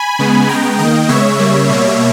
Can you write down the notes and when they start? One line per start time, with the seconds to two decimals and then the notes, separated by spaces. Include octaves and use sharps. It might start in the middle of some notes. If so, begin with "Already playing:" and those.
Already playing: G#5 B5
0.19 C#3 G#3 B3
0.49 C#3 G#3 B3 G5 A#5
0.79 D#3 A#3 D#5 G5
1.08 C#3 G#3 B3 C#5 E5
1.39 C#3 G3 A#3
1.69 B2 G3 A#3